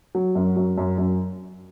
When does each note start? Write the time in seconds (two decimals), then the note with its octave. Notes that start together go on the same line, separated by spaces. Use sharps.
0.15 F#3
0.35 F#2
0.57 F#2
0.78 F#2
0.98 F#2